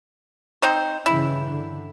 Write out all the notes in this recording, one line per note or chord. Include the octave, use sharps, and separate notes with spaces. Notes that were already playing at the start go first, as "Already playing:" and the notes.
C4 D#4 C5
G2 C#3 E3 E4
D3